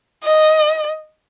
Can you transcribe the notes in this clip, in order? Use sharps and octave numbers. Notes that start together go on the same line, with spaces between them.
D#5